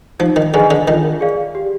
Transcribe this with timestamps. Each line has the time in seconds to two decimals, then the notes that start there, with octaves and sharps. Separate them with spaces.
0.20 F3 D#4
0.36 D#3
0.54 D3 G#4 B4 D#5 G#5
0.71 D3
0.87 D#3 F4
1.21 G#4 D5 F5
1.55 G4